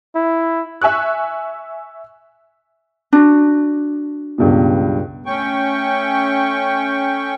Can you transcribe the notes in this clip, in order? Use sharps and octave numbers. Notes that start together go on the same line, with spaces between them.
E4
E5 G#5 C#6 F#6
D4 F#4
C#2 G2 B2
A3 C#4 G5 C#6